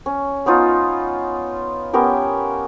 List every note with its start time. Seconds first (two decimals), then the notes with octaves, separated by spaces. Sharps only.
0.06 C#4
0.46 B3 C#4 D#4 F4
1.93 B3 C#4 G4 A#4